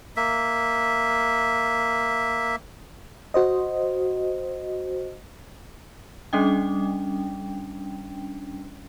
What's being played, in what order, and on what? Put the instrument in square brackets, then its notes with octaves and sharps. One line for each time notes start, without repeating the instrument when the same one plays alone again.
[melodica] A#3 E5
[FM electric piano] F#4 C5 D#5
[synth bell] G3 C#4 D4 G5